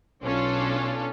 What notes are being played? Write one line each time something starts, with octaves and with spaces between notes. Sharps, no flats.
B1 C#4 D4 F4 A4